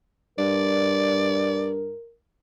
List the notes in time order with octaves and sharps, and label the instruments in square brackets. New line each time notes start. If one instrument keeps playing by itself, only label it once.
[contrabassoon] G2 [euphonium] A#4 [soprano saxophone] D5